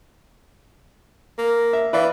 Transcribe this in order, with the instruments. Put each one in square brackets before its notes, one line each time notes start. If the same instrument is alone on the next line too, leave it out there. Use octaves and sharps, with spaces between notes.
[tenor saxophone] A#3
[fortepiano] E5
[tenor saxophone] E3 [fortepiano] B4 D5 F5